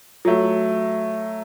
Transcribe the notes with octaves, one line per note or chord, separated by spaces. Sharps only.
F#3 A3